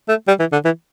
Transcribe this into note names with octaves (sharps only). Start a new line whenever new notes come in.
A3
G3
E3
D3
E3